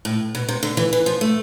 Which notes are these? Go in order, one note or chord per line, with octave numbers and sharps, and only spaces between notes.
A2
B2
C3
D3
E3
E3
F3
A3